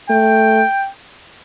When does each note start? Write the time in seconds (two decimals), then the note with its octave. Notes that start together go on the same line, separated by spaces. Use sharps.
0.10 A3 G5